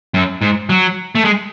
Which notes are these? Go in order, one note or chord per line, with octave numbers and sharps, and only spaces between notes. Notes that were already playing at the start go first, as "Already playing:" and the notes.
F#2
G#2
F#3
A3
G#3